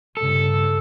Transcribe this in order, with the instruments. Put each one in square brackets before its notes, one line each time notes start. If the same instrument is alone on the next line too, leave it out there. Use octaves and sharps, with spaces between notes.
[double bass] G2 C#3 [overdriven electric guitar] A4